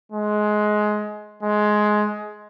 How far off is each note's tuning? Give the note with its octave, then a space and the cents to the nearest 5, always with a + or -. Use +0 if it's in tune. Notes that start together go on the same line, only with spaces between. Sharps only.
G#3 +20
G#3 +15